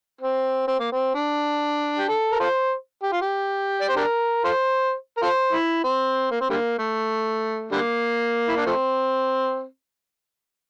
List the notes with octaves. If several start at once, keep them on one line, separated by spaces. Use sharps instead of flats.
C4
C4
A#3
C4
D4
G4
A4
A#4
F4 A4 C5
G4
F4
G4
D5
C5
D4 G4 A#4
F4 A4 C5
A#4
F4 A4 C5
E4
C4
A#3
C4
D3 G3 A#3
A3
D3 G3 A#3
E4
D4
F3 A3 C4